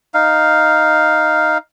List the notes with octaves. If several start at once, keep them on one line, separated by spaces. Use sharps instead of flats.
D#4 F5